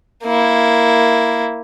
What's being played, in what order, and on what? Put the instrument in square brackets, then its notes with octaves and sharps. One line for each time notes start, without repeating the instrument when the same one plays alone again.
[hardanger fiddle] A#3 E4